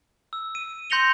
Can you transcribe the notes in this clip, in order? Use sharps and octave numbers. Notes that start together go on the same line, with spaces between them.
E6
D#7
C6 G6 A#6 C#7 F7 G7